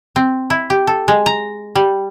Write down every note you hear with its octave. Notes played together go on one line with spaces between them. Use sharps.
C4
E4
G4
A4
G#3
A#5
G3